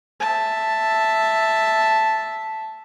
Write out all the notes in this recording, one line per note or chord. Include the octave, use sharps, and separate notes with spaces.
E5 A5